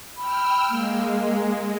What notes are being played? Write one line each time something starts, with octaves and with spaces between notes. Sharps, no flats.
G5 B5 E6 F6
G#3 A#3